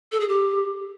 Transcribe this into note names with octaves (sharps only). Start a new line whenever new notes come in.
A4
G#4
G4